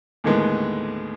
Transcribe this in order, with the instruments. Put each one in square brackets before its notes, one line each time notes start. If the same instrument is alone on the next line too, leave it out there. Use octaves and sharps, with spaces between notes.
[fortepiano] D#2 A2 D3 D#3 G#3 B3